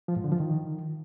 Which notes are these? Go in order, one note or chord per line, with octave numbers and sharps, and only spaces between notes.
F3
G#2
D3
F3
D#3